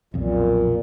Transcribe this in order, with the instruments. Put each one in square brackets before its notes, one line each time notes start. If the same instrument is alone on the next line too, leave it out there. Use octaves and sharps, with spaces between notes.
[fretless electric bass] B1 F2 [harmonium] A#2